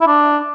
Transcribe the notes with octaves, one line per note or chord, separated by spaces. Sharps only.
E4
D4